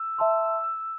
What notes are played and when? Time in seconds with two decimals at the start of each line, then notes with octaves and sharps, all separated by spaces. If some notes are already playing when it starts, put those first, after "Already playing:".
Already playing: E6
0.18 E5 A5 C6